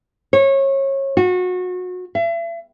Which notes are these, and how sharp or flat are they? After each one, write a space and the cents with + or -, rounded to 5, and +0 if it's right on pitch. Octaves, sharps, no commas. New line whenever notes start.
C#5 -25
F#4 -30
E5 +40